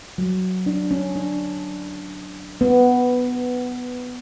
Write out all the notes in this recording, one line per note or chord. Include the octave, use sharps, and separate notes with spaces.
F#3
D4
C#4
D4
B3